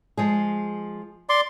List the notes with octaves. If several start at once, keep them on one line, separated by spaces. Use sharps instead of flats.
F3 G#3 G#4
D5 C6